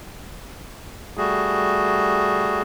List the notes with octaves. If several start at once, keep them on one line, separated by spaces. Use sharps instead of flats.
G3 A3 F#4 G#4